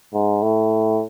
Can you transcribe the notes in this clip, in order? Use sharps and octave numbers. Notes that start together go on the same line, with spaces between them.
G#2
A2